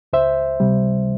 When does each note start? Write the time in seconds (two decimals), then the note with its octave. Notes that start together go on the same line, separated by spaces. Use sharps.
0.13 C#2 C5 E5
0.60 C3 G3